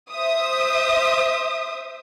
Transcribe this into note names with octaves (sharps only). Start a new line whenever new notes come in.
C5 E5 D#6